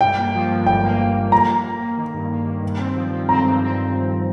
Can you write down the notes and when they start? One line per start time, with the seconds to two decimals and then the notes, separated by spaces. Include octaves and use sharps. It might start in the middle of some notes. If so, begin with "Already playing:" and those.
0.01 G2 G5
0.18 A#3
0.34 F3
0.50 G2
0.66 G1 G5
0.83 A#3
1.00 G1
1.16 G1
1.32 A#3 A#5
1.49 A#3
1.64 A#3
1.81 A#3
1.97 D#3
2.14 G2
2.31 A#3
2.46 D#3
2.63 G2
2.79 C4
2.96 F3
3.12 F3
3.29 C4 A#5
3.45 G2
3.62 C4